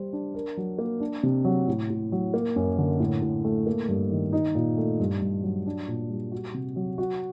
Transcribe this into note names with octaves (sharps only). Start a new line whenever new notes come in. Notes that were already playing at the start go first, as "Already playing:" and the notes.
Already playing: G3 C5
D4
A#4
F#3
A#3
D4
C3
F#3
A2
A2
F#3
A#3
F#2
D3
A2
A2
A3
A#3
G2
D#3
D#4
A#2
A3
G2
G2
F#3
D4
A#2
G3
F#4
C3
F#3
F#4